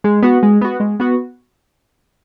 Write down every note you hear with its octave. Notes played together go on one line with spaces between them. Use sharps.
G#3
B3 F#4
G#3
B3 F#4
G#3
B3 F#4